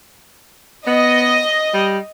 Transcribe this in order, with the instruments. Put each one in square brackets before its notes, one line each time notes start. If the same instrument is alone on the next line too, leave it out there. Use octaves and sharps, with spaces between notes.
[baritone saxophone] B3 [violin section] D#5
[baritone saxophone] G3